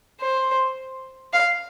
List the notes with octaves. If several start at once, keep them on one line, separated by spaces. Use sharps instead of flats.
C5
F5